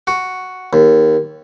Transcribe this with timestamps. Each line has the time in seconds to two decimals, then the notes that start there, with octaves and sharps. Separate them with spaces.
0.07 F#4
0.73 D#2